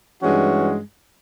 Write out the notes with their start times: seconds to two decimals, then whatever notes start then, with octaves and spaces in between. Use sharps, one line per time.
0.22 G2 E3 G#3 C#4 F#4